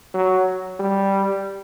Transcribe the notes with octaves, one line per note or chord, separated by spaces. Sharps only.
F#3
G3